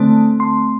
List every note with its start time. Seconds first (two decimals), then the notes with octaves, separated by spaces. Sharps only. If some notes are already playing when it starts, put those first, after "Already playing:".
Already playing: D3 A3 C4 A5
0.40 C6